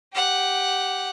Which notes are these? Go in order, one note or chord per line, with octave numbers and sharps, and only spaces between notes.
G4 F#5